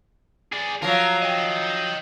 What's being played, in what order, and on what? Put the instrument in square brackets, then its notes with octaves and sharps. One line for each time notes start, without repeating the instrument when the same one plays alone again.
[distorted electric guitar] G#4 D5
[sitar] F3 F#3 [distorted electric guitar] A#4
[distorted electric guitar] D#5 G5